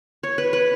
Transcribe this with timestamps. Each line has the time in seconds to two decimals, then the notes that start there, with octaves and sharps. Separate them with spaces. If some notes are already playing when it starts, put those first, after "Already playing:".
0.23 C#5
0.38 B4
0.53 B4